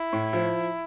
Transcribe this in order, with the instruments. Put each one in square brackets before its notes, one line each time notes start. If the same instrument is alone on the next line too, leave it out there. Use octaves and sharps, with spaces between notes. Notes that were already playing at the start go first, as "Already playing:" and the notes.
Already playing: [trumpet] E4
[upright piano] A2
F3